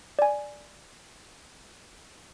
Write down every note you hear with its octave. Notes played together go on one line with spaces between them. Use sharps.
D5 G#5